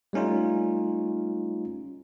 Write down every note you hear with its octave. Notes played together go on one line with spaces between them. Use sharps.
G3 A3 C#4 D#4 F4